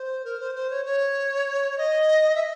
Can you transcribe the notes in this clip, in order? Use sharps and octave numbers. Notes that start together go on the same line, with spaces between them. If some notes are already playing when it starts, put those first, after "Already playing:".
Already playing: C5
A#4
C5
C5
C#5
C#5
D#5
E5